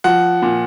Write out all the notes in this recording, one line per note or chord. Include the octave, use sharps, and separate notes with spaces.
F3 F#5
A#2